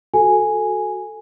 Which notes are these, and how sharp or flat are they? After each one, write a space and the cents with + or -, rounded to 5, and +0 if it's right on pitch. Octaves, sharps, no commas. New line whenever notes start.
F#4 +0 A4 +0 G#5 +0